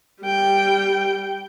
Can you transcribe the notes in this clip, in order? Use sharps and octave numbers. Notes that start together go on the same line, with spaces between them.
G3 G5